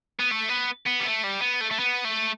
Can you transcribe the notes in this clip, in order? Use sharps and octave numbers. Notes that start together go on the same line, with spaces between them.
B3
A3
B3
B3
G3
A3
G3
B3
A3
A3
B3
A3